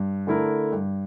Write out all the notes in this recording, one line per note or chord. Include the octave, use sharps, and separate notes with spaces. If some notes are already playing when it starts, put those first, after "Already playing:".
Already playing: G2
D3 A3 E4 A#4
G2